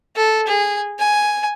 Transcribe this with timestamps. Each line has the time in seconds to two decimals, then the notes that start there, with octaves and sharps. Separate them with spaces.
0.16 A4
0.47 G#4
0.99 G#5